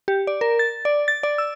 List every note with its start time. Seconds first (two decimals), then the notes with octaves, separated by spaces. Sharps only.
0.08 G4
0.27 D5
0.41 A#4
0.59 A6
0.85 D5
1.08 A6
1.23 D5
1.38 E6